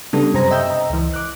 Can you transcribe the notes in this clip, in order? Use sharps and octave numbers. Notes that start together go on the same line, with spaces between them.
C#3 G3 B3 D4 A4
F#2 C3 C4 C5 A#5 A#6
D#5 E5 G5 E6 G6
D#5 A#5
C#2 E3
D6 F#6